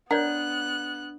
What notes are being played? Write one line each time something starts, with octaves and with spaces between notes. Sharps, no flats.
B3 D4 A#4 C#5 D5 F#5 F#6